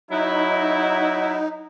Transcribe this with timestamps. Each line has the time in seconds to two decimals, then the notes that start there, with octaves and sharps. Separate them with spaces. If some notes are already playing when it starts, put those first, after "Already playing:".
0.11 F#3 D#4 E4